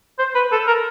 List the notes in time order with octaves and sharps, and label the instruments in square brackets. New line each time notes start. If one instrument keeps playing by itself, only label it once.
[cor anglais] C5
B4
A4
A#4